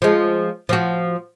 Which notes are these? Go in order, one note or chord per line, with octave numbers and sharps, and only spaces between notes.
F3 G#3
F3 F#4